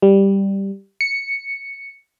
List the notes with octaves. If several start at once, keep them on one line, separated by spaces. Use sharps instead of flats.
G3
C#7